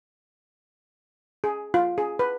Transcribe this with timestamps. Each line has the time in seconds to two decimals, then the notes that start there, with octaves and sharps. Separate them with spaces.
1.44 G#4
1.74 F4
1.98 G#4
2.19 B4